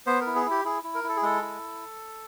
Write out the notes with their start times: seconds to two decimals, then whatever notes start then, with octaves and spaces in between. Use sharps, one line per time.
0.07 B3 C5
0.21 A#4
0.27 E4
0.35 G#4
0.46 E4 G4
0.65 E4 G#4
0.84 E4
0.95 A#4
1.04 E4
1.09 A4
1.16 G#4
1.23 G#3 A4
1.42 E4